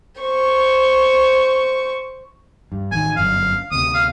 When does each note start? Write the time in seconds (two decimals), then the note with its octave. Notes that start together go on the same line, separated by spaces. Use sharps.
0.21 C5 C#6
2.72 G2
2.92 A1 D#3 G#5
3.17 G1 F#2 D3 F5
3.72 D2 C3 D#6
3.95 F5